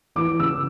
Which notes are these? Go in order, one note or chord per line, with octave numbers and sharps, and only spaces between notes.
E3 D6
C#3 E6